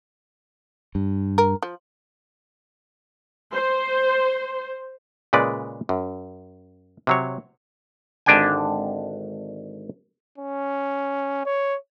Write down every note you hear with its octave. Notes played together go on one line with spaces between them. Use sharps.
G2
A#4
F3
C5
A#2 C#3 G#3 B4 D5
F#2
C3 F#3 C#5
G#1 D3 D4 G4 G5 G#5
C#4
C#5